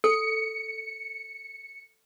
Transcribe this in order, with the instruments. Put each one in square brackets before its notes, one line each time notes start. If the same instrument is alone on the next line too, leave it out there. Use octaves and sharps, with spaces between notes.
[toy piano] A4 [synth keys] C#7